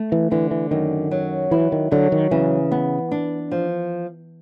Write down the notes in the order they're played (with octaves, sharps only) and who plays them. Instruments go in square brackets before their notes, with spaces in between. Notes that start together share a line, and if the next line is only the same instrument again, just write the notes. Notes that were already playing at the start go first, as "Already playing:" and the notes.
Already playing: [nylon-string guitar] A3
[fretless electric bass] E3
[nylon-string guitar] D3 [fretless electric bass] E3
[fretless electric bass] E3
[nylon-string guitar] F#2 [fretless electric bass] D#3
[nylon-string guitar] F#3
[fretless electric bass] E3 [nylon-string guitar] E4
[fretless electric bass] D#3
[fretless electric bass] D3 [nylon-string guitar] F#3
[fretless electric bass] D#3
[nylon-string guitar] C#3 [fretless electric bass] E3
[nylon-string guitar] B3
D4
F3